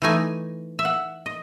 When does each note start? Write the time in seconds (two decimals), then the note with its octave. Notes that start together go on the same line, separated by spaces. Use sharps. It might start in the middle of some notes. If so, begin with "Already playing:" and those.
0.02 E3 A3 D#4 G#5
0.79 E5
0.85 F#5
1.26 D#5